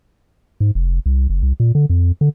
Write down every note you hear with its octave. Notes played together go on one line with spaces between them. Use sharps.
G#2
F1
C2
F#1
C2
A#2
D3
F2
D3